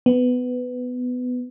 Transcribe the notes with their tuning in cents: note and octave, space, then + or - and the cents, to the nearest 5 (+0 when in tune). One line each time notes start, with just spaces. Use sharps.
B3 +15